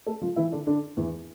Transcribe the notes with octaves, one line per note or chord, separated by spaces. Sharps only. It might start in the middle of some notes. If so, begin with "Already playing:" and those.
A3 A4
F3 F4
E3 E4
D3 D4
D3 D4
E2 E3